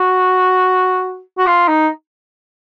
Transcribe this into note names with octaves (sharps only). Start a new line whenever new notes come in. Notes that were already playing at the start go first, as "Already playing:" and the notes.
Already playing: F#4
F#4
F4
D#4